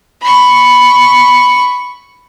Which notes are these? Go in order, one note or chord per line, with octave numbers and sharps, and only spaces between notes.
B5 C#6